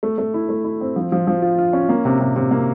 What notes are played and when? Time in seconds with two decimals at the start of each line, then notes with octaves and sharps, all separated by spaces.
0.03 A3
0.18 A3
0.34 E4
0.49 A3
0.64 E4
0.81 C4
0.96 F3
1.12 F3
1.27 F3
1.42 F4
1.58 F4
1.73 C#4
1.89 A#3
2.05 C3
2.20 C3
2.36 C3
2.51 A#3